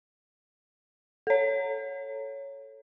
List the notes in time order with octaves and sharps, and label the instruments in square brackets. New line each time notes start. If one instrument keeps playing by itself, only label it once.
[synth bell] A4 C#5